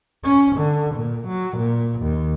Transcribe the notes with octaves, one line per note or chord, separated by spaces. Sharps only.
C#4
D3
A#2
F#3
A#2
D#2